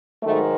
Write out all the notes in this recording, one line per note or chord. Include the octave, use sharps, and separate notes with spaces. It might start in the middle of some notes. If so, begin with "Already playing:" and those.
G#2 D#3 F#3 A3